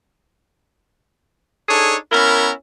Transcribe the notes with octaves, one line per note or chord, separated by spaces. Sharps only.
D4 D#4 G#4 A4 C#5
B3 C#4 E4 A#4